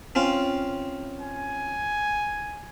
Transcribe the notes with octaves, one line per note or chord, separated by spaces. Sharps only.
C4 C#4 F4
G#5